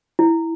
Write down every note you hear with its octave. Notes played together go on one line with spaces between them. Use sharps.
E4